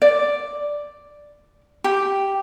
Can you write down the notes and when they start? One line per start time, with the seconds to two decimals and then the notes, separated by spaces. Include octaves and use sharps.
0.02 D5
1.84 G4